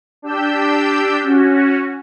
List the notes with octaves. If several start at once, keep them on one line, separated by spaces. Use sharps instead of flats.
D4 G4 E6 G6
C#4 F#4